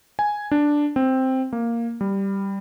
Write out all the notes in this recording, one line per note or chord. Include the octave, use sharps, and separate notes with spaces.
G#5
D4
C4
A#3
G3